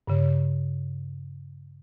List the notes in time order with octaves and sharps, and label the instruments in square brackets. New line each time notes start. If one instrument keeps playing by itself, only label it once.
[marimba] G2 C#3